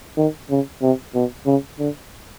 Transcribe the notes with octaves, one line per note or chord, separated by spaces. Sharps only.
D#3
C#3
C3
B2
C#3
D3